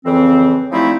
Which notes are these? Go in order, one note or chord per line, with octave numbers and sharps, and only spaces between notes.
F2 C#3 E3 C4
F3 G3 A3 C4 D#4 E4